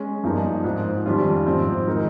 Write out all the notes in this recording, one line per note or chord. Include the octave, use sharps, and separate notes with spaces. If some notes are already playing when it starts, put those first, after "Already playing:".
Already playing: G#3 C#4
G2 F3 A#3 D#4 A#4
G#2 F3 C4
F2 D#3 G3 C#4 F4
G#2 F3 C4
D#3 G#3 D#4 A#4